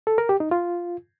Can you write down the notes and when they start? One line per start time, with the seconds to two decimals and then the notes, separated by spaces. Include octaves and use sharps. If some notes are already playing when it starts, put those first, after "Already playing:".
0.07 A4
0.18 A#4
0.29 G4
0.40 D#4
0.51 F4